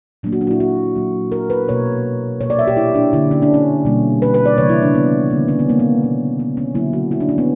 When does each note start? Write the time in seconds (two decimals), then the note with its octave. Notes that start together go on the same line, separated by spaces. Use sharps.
0.23 A#2 F#3 A#3 D4
0.33 F#4
0.41 D4
0.47 F#4
0.51 E4
0.60 F#4
0.95 A#2 F#3 A#3
1.32 A#4
1.50 B4
1.68 B2 A#3 C#5
2.41 A#2 A#3 C#5
2.50 D5
2.59 E5
2.67 G4
2.77 E4
2.95 D4
3.13 D3 A#3 E4
3.31 C#4
3.42 D4
3.54 C#4
3.85 B2 G3 A#3
4.22 B4
4.34 B4
4.46 D5
4.58 C#3 E3 G3 A#3 C#5
4.69 E4
4.83 D4
4.95 B3
5.30 D3 A#3
5.48 C#4
5.59 B3
5.69 A#3
5.79 B3
6.03 B2 A#3
6.39 B3
6.57 C#4
6.75 D3 F#3 A#3 E4
6.93 F#4
7.11 E4
7.20 D4
7.29 C#4
7.38 B3